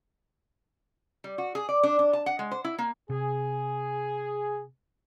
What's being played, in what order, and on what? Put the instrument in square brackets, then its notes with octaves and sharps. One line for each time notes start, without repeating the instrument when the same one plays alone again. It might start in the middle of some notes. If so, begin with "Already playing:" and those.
[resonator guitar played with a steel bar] G3
F#4
G#4
D5
D4
D4
A5
F#5
G#3
C5
E4
A#3
[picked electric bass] C3 [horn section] G#4